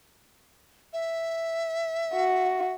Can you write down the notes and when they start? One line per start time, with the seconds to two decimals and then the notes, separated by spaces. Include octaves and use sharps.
0.93 E5
2.14 F#4